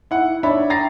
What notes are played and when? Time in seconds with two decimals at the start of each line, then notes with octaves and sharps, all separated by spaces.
0.11 E4 F#5
0.43 D4 C#5 E5 B5
0.70 G5 A#5 A6 A#6 C7